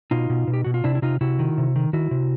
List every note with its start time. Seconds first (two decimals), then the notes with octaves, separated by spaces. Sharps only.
0.11 B2 D#4 F4
0.30 B2
0.47 B2
0.53 G4
0.64 B2 F#4
0.74 F4
0.84 C3 D4 E4
0.95 E4
1.02 C3 D#4 F4
1.21 C3 E4 F#4
1.39 D#3
1.58 C3
1.76 D#3
1.93 D#3 E4 F#4
2.11 C3